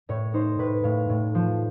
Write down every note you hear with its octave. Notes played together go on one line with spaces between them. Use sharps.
A2 C#5
D#4 C5
A2 B4
A2 F5
A2
F3